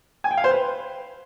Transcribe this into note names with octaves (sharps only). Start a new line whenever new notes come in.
G#5
G5
F5
C5
B4